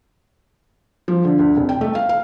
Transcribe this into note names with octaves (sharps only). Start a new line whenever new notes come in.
F3
D3
D2
F1
G5
A3
F5
F5